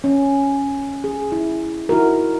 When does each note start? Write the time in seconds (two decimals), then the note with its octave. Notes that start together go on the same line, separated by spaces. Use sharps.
0.04 C#4
1.04 G#4
1.32 E4
1.89 D#4 E4 F#4 A#4